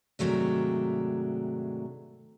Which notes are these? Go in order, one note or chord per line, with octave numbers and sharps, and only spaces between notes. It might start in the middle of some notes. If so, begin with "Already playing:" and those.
G#2 C3 D#3 F#3 A3 D4